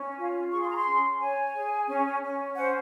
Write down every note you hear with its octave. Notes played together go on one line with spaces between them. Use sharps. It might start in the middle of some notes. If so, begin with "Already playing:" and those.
Already playing: C#4
F4
G#4 C#6
C6
A#5
C6
C#4
C#5 G#5
G#4
C#4
C#4
C5 F#5